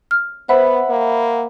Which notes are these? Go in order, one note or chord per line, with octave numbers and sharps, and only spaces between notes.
F6
B3 C5 E5 F#5 B5
A#3